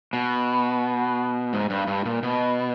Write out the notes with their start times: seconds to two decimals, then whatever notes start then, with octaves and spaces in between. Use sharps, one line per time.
0.13 B2
1.53 G#2
1.70 G2
1.87 G2
2.05 A#2
2.23 B2